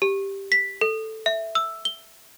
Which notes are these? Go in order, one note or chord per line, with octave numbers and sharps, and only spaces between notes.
G4
B6
A4
E5
E6
G7